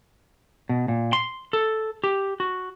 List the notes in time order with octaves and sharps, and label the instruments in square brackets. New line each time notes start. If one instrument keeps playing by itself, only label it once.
[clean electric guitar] B2
A#2
C6
A4
G4
F#4